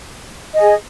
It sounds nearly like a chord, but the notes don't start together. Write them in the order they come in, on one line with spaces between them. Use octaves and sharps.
D#5 G#5 G#4